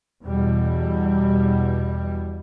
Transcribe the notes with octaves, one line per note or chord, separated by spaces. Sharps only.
E2 B2 G3